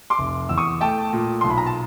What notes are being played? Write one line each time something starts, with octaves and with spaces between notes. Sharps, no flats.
C6 D6
F1
E2 E6
C#6 D#6
A3 G5 A5
A#2
B1 C6
B5
A#5
A5